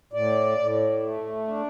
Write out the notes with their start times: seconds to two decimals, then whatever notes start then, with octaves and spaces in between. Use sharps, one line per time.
0.13 A2 D5
0.58 A2
1.03 A3
1.47 D4